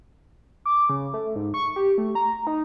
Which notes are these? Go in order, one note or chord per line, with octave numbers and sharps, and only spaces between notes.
D6
C#3
A3
G#2
C#6
G4
A3
A#5
D#4